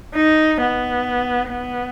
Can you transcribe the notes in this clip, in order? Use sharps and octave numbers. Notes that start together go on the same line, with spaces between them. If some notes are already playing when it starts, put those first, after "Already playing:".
D#4
B3
B3